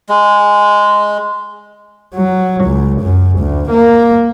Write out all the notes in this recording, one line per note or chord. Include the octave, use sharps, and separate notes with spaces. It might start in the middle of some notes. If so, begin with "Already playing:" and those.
G#3
F#3
C#2
F#2
D2
A#3